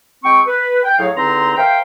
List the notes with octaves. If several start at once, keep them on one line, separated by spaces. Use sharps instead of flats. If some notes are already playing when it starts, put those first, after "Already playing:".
G#3 C4 G5 C#6
B4
G5
A2 F#3 G#4 C#5 F5
E2 D3 C4 D#4 A#5 C6
A#4 C5 E5 F5 G5